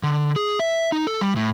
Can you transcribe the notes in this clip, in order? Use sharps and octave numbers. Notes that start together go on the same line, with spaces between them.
D3
G#4
E5
D#4
A4
G3
A2